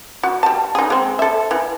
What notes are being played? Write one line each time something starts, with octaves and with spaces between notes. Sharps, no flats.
F#4
G3 A5
D#4 G#4
G#3 C4
A4 E5
E3